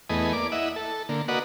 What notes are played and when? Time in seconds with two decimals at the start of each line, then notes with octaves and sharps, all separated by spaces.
0.09 E2 A3 B3 G#4 D#5
0.33 A#3 D5 D6
0.52 E4 D#5 E5 F#5
0.76 A4
1.09 D3 A#3
1.28 A#3 F#4 B4 D5 D#5 F#5